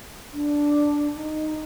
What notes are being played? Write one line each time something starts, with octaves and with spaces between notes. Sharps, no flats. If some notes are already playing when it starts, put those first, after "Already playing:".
D4
D#4